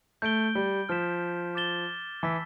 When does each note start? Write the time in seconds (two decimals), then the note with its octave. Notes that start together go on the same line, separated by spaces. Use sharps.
0.22 A3 G6 D7 G7
0.55 G3
0.89 F3 F6 B6 E7
1.55 D6 A6 E7 G7
2.23 E3 A5 E6 B6